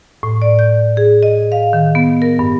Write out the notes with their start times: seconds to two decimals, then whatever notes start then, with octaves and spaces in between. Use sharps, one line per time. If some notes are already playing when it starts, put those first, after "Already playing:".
0.23 A2
0.42 D5
0.59 G6
0.97 G#4
1.23 D#5
1.52 F5
1.73 D#3
1.95 B3
2.22 A#4
2.39 G2